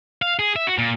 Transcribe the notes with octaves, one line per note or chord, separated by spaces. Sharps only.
F5
G#4
E5
F#4
A#2